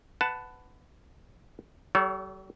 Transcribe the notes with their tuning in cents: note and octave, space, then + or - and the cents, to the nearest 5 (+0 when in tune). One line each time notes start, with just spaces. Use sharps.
B4 +20 F#5 +0 A5 +0
G3 -40 A4 -25 C#5 +25